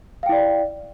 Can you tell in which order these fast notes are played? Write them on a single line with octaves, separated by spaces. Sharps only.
F5 G5 E4 D5